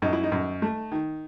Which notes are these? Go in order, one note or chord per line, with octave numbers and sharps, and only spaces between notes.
F#2 D#4
E4
D#4
F#2
A3
D#3